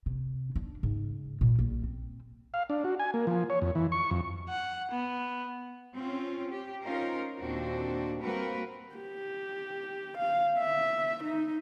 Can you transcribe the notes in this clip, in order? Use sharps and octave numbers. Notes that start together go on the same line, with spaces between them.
C3
D4
G#2 C#3
A#2 G3
A#1
C4
F5
D4
F#4
G#5
A#3
F3
C#5
F2
E3
C#6
F2
F#5
B3
C4 C#4 F4
G4
C#4 D#4 F4 A#4 C5
D#2 A#2 C4 D4 F#4
G3 A#3 C4 F#4 A#4 B4
G4
F5
E5
D#4